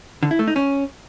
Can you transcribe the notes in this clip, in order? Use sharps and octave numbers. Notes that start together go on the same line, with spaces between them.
D3
E4
A3
D#4
C#4